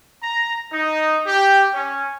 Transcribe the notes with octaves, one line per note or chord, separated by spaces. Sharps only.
A#5
D#4
G4
C#4